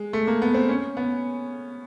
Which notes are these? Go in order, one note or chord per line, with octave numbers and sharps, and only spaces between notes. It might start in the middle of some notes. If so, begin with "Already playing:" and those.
Already playing: G#3
A3
A#3
B3
C4
C#4
B3